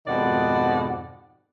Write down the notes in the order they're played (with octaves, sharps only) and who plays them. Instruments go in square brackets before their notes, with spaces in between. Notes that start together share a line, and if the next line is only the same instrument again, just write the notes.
[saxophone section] F2 G#2 B2 D#3 D5 F#5